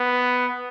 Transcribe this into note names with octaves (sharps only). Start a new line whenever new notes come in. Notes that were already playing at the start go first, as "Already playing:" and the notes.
Already playing: B3